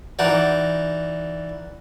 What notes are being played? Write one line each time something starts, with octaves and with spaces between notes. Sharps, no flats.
E3 D#4 F#4 D5